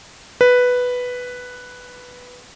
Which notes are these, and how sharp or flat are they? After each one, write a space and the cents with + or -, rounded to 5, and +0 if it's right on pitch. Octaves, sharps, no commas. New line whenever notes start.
B4 +0